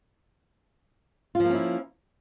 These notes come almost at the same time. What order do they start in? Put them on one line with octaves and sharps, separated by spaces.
F4 F3 A#3 C#4 E4